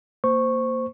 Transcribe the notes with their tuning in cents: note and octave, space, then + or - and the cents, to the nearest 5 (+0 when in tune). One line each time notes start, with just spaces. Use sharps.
A#3 -10 C5 -10 C#6 -10